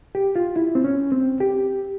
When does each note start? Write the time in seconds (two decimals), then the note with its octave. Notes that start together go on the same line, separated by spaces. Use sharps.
0.15 G4
0.36 F4
0.56 E4
0.75 C4
0.84 C#4
1.12 C4
1.40 G4